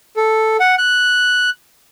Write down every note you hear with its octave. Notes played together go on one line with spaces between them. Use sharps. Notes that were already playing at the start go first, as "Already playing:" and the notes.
A4
F#5
F#6